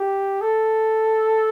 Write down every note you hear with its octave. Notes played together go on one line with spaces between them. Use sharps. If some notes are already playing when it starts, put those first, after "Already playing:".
Already playing: G4
A4